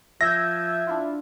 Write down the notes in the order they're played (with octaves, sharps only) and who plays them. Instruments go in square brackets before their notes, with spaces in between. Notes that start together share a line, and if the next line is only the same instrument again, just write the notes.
[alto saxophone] F3 [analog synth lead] E5 [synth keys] E6 G6 G#6 [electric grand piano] A#6
[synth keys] D4 E4 F4